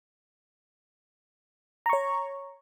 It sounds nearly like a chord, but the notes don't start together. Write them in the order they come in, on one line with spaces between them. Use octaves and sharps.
A#5 C#6 C#5